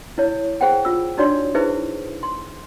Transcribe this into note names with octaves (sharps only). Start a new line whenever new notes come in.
E4 C#5
G#4 C5 F#5 G5
F4 E6
D4 D#4 F#4 C#5 D5 C6
D#4 E4 G#4 B4 C5 E5
C6